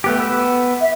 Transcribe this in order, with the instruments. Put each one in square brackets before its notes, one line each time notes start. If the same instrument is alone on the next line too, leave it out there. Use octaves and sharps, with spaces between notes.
[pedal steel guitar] A3 B3 G4
B3 E6
[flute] E5